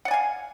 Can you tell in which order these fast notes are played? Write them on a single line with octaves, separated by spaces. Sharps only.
F#5 D5 G#5 F5